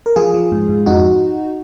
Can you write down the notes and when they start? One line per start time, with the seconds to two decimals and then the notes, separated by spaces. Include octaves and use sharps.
0.06 A#4
0.16 F3 F4 G#4
0.34 F3
0.52 G#2
0.69 G#2
0.86 F2 D#4 F#4